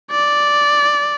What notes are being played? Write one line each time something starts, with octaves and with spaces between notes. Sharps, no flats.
D5